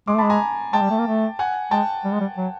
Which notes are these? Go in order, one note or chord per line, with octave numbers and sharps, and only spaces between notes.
G#3 C6 D6
A3
G#3 A5 B5
G#5 A#5
G#3 G5 A5
G3
A3
A#3
A3
F#5 G#5
G#3 G5 A5
G3
G#3
G3
F#3